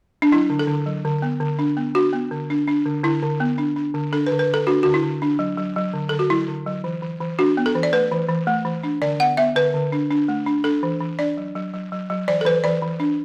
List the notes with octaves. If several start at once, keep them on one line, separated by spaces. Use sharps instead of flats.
D4
F#3 E4
D3
A4
D3
F#3
D3
B3
D3
D4
B3
D4 F#4
B3
D3
D4
D4
D3
D3 E4
D3
B3
D4
D4
D3
D4 A4
B4
D3
B4
D3 A4
D4 F#4
D3 F#4
E4
D3
D4
F#3
F#3
F#3
D3
D3 A4
F#4
F#3 E4
D3
F#3
E3
E3
E3
D4 F#4
B3
A4
E3
D5
A3 B4
E3
E3
A3
E3
D4
D3 D5
B3 F#5
B3 E5
D3 B4
D3
D4
D4
A3
D4
D4 A4
E3
E3
D4 D5
F#3
F#3
F#3
F#3
F#3
E3 D5
A4
E3 B4
E3 D5
E3
D4